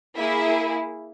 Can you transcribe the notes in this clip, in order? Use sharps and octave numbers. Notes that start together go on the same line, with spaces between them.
A#3 E4 G#4 E5